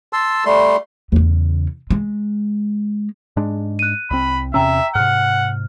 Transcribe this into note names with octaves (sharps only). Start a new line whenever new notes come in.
A5 C6 E6
G3 A3 C6
E2 C#3
G#3
G#2 G#3 D4
F#6 D#7
C2 C4 B5
E2 C3 C#4 E5 G5 A#5 E6
G#2 C3 F#5 F6